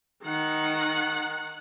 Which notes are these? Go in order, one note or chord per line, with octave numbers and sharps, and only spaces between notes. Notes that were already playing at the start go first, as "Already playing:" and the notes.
D#3 F#5